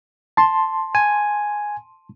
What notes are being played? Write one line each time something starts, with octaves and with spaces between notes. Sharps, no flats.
A5 C6
G#5